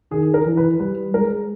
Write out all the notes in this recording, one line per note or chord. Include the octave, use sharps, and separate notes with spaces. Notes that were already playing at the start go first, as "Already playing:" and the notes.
D#3 G#4
A#4
E3
B4
G3 B4
G#3 A#4